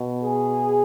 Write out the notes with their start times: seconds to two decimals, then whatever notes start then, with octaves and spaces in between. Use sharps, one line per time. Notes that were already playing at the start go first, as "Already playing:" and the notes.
Already playing: B2
0.24 G#4